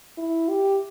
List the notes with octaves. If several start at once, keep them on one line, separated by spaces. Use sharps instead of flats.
E4
G4